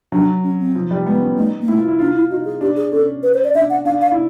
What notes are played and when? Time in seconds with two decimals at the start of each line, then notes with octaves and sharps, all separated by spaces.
0.12 F#3 D4
0.44 C#4
0.59 C4
0.75 F3
0.91 G3
1.06 G#3 B3
1.21 C#4
1.37 A3 D#4
1.61 A#3
1.68 A3 E4
1.78 F4
1.88 E4
1.99 D4 F4
2.15 E4
2.30 D#4 F#4
2.45 G#4
2.61 D4 G4
2.76 G#4
2.92 C#4 A4
3.23 B4
3.34 C5
3.44 D5
3.55 D4 E5
3.70 F#5
3.85 D4 F5
4.01 F5
4.11 E4